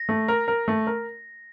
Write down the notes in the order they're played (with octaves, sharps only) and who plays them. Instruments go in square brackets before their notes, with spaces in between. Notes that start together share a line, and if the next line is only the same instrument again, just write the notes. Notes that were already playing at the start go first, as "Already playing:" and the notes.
Already playing: [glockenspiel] A#6
[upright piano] A3
A#4
A#4
A3
A#4